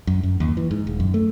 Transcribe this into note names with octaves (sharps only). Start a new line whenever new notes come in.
F#2
F#2
D#2
E3
G#2
D#1
F#2
A3